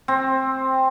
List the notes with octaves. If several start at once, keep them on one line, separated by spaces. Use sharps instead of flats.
C4